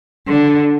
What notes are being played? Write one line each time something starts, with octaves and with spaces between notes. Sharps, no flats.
D3